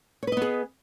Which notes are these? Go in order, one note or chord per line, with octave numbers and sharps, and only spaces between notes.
B3 G#4 B4 C#5 D#5